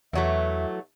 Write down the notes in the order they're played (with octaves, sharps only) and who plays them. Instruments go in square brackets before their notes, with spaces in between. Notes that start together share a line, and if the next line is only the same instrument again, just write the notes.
[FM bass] E2 [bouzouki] E3 F#3 A3 [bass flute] E5